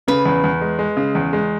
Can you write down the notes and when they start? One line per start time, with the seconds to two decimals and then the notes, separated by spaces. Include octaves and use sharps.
0.08 C#3 B4
0.26 E2
0.44 E2
0.61 G#3
0.79 G#3
0.97 C#3
1.15 E2
1.33 G#3